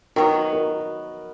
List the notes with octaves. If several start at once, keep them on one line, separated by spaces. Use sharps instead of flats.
D#3 F#3 B3 F#4 A#4
F#4 A#4